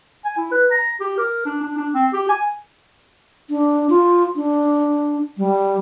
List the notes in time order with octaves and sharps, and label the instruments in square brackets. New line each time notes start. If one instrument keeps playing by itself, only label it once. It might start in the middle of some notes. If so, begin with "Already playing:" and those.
[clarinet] G#5
E4
B4
A#5
G4
A#4
D4
D4
D4
C4
G4
G#5
[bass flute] D4
F4
D4
G3